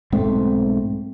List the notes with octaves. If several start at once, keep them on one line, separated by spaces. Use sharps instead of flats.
B1 G#2 A3 C4